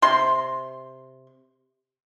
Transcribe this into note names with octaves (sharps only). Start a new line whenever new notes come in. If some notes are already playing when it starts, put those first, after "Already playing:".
C3 C6